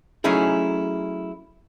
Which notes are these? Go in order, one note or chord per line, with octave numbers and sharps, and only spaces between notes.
F#3 A3 C#4 D#4 E4 G#4